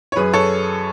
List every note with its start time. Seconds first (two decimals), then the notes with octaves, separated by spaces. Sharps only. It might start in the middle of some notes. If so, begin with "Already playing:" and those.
0.12 C#5
0.16 F#2 G#4 B4
0.33 A4 C#5